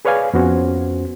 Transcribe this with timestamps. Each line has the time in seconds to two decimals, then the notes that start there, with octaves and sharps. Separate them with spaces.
0.05 G#4 B4 C#5 D5 F5 G#5
0.34 F2 B3 C#4 F#4 C5